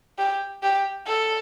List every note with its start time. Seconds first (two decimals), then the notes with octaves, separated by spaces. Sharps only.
0.18 G4
0.63 G4
1.07 A4